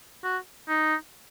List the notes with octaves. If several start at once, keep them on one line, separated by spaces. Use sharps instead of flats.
F#4
D#4